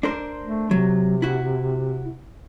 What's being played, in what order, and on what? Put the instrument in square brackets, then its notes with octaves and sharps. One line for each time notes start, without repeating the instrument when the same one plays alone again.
[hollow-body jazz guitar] D4 A#4 C5
[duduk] A3
[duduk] C3 [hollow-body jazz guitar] F#3
[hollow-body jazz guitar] E4 F#4